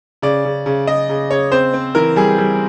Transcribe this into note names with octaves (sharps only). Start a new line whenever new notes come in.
C#3 D5
C#3
C#3
C#3 D#5
C#3
C#3 C#5
C4 C5
C4
E3 A#4
G3 G#4
G3